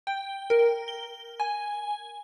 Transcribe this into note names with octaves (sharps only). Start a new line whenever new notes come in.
G5
A#4
G7
G#5